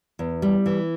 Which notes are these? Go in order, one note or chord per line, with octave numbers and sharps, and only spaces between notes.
E2
G3
E3